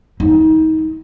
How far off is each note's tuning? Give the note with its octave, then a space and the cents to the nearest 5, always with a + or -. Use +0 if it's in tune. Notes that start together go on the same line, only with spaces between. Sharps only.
D#4 +30